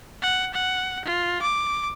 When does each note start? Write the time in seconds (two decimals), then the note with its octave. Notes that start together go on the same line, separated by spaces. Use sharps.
0.22 F#5
0.54 F#5
1.05 F4
1.42 D6